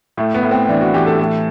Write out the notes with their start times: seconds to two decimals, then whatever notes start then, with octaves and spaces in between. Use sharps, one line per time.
0.17 A2 A3
0.34 B3
0.43 A2
0.51 C4
0.69 E3 D4
0.81 F#4
0.94 E3 G4
1.06 A4
1.19 A2